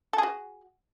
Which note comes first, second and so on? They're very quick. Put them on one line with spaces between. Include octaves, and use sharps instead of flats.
A4 G#4 F#4